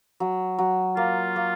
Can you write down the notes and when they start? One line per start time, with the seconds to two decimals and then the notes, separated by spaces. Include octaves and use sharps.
0.20 F#3
0.58 F#3
0.96 A#3 F4
1.36 A#3